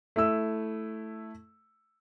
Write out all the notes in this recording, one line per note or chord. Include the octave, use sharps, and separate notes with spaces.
A3 E4 E6